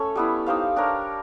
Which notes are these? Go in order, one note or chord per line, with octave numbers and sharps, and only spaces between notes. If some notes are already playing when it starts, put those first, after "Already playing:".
Already playing: A3 C#4 A4 C#5
G3 B3 E4
D#4 G4 C5 F5
D4 G4 A#4 C#5